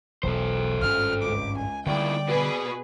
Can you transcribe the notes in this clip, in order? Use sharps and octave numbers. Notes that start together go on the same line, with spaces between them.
E1 B1 B2 A4 C5
G#1 G2 C#4 F6
C#2 D6
G#5
D#2 D3 G3 E4 D5 G5
B2 B3 F#4 G#4 B4